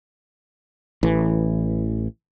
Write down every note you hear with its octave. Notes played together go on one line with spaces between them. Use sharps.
A1 E3